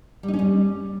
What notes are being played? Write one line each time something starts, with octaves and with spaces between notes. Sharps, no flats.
G3
D#4
C#4
G3